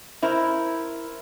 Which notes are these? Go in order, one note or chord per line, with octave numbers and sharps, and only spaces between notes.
E4 A#4 C5